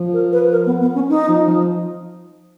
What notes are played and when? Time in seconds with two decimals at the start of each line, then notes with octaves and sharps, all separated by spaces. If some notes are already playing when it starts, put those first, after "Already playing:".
Already playing: F3
0.13 A#4
0.32 B4
0.52 A#4
0.66 B3
0.81 B3
0.94 C#4
1.09 D#4
1.28 F3
1.47 F3